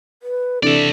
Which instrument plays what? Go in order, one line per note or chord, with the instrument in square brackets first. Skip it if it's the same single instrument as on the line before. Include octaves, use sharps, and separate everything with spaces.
[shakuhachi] B4
[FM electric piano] C3 E3 [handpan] D4 [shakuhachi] A4 [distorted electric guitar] D5 E5